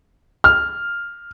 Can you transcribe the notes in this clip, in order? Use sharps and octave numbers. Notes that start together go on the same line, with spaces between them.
F6